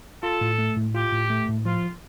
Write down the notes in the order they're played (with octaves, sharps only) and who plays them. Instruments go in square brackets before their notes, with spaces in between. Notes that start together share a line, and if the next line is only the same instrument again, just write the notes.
[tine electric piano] F4 [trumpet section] A4
[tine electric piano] A2
A3
A2
[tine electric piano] F4 [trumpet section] G4
[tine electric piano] A2
A3
A2
[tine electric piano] F3 [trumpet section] F4